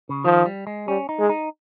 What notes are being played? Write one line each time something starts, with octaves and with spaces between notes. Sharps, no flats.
C#3
D#3 F3
G3
G#3
G3 C#4
D#4
G#3
D#4